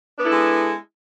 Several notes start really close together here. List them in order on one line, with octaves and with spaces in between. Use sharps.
D4 B3 E4 A4 G#3